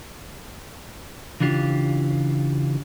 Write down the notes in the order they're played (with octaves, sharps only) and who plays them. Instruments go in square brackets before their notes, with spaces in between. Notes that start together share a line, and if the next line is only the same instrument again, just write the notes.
[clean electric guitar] C#3 E3 D4 F4 G4